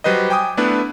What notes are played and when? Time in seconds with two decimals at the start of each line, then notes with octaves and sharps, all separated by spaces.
0.04 F#3 G3 B4 C5 D#5
0.30 G5 G#5 D6 D#6
0.57 A3 B3 D4 E4 B4